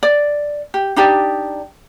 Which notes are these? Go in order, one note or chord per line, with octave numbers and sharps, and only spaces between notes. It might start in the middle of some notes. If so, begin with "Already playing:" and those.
D5
G4
D4 D#4 G4 D5